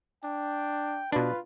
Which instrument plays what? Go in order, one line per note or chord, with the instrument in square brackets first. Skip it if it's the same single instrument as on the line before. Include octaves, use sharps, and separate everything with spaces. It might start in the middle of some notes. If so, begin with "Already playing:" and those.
[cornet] D4 [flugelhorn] G5
[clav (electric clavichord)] B2 D4 [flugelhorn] F4 [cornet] B4